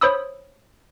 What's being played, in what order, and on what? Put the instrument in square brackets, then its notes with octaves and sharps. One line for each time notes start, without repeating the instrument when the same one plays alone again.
[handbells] C5 C#5 B5 D#6 E6